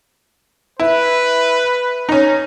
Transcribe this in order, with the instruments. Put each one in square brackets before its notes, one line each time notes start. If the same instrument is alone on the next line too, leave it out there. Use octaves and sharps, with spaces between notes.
[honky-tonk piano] E4 [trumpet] B4
[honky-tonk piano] C#4 D#4